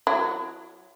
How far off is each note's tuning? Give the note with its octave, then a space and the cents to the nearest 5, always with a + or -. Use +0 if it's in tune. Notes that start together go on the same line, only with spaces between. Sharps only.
F#3 +0 E4 +35